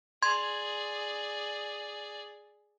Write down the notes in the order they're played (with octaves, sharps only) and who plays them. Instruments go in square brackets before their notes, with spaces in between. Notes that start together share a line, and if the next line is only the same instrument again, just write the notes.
[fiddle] G#4 D5 [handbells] C6 G#6